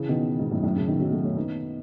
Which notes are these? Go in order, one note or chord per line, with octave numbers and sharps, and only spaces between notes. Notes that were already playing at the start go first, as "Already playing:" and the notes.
Already playing: C#3 E3
B2 D#3
G#2 B2
F#2 A2
F#2 A2
A2 C#3
B2 D#3
D#3 F#3
F#3 A3
A3 C#4
B3 D#4